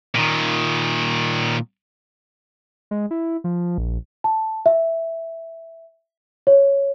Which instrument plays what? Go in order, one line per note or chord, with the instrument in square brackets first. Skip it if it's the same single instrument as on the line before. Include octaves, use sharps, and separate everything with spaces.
[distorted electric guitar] A#2 D#3
[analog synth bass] G#3
E4
F3
A#1
[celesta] A5
E5
C#5